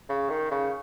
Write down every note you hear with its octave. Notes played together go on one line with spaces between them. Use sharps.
C#3
D#3
C#3